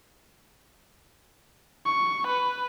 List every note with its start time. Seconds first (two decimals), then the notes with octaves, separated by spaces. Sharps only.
1.86 C#6
2.27 B4